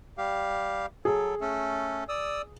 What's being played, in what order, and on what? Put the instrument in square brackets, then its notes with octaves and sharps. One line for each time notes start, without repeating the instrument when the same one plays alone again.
[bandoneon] G3 G4 F5
[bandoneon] F#3 A4 [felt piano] G#4
[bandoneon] A3 C#4 A4
D5 D#6 E6